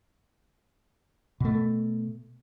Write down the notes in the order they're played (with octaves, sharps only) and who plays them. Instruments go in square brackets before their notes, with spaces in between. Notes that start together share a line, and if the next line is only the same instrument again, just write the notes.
[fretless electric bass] B2 A3